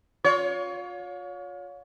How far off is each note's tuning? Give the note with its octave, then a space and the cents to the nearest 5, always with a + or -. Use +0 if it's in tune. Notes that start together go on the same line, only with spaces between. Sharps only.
F4 +35 C#5 +30